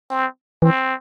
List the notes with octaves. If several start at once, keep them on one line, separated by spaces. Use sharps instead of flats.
C4
E3 C4